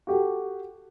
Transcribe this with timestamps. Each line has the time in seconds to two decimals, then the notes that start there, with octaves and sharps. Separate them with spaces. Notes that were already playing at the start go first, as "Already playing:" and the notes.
0.07 F#4 G4 A4